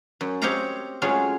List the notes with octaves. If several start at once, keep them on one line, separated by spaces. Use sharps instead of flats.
F#2
C4 G4 C#5 D#5 F5 A#5
F#3 G#3 A3 C#4 F4 G#4